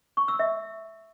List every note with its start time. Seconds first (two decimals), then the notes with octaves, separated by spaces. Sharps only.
0.17 C#6
0.28 E6
0.39 E5